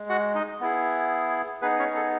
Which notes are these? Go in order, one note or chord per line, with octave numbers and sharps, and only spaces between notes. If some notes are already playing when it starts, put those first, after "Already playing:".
Already playing: G#3
F#4 F#5
D#4 D#5
B3 E4 G#4
B3 D#4 G#4 B4
C#4 C#5
A4